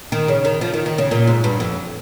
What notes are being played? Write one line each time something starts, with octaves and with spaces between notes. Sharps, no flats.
D#3
C#3
D#3
F3
D#3
D#3
C#3
A#2
G#2
G2
F2